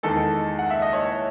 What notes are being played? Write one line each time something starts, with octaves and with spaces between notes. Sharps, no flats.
E2 D#3 G#3 A4
F#5
E5
D#5
C#5